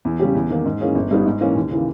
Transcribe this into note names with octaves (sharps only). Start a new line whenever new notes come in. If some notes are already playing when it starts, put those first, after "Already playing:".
E2
C#3 G3 C#4 G4
E2
D#3 A#3
G#2
E3 A#3 C#4 G#4
G1
G2 G3 B3 D#4
G#2
E3 A#3 C#4
D#2
C#3 E3 A#3